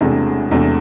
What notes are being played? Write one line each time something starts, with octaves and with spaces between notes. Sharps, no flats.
E1 E2 C3 A3 D4
E1 E2 C3 A3 D4